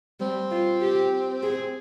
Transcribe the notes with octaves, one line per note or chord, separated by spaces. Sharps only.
G3 C4
F4
G4
G#4